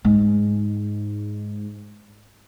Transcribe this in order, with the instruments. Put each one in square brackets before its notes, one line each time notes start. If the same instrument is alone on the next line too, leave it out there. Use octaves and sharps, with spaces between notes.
[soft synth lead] G#2 [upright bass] G#3